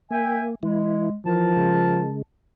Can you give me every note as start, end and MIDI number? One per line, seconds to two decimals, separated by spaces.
0.11 0.55 58
0.11 0.44 76
0.11 0.44 79
0.11 0.44 80
0.63 1.10 52
0.63 1.14 56
0.63 1.10 64
1.26 1.54 52
1.26 2.03 53
1.26 2.14 70
1.26 2.14 81
1.56 2.22 49
1.56 2.22 56